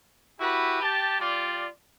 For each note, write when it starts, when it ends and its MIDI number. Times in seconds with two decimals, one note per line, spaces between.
0.39 0.78 64
0.39 0.78 66
0.39 0.78 67
0.39 0.78 71
0.81 1.19 67
0.81 1.19 81
1.20 1.68 55
1.20 1.68 65
1.20 1.68 74